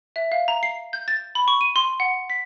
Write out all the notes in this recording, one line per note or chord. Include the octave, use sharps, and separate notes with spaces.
E5
F5
A#5
C7
G6
A6
B5
C#6
D#7
C6
F#5
B6